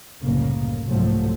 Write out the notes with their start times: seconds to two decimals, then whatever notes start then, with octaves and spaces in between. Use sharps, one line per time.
0.23 F#1 C2 A2 C#3 A#3
0.89 C2 G#2 F3 F#3 A3